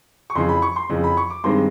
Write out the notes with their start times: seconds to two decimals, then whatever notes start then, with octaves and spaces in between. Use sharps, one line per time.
0.30 C#6
0.35 F2 C#3 E3 C6
0.49 B5
0.62 C#6
0.76 C6
0.89 F2 C#3 E3
1.04 B5
1.17 C#6
1.30 D6
1.44 G2 D#3 G#3 C4 C6